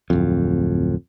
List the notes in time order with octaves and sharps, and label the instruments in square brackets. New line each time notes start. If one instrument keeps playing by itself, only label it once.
[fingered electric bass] D1 F2